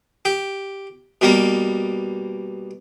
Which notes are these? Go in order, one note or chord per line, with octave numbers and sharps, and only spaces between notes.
G4
B2 G3 A#3